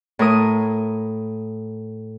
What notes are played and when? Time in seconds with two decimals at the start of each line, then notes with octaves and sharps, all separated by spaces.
0.19 A2 A#4 D#6